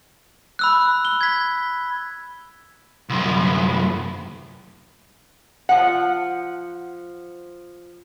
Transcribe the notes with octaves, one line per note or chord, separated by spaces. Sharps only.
B5 E6 F#6
G7
G#6 B6
C2 F#2
F3 F#5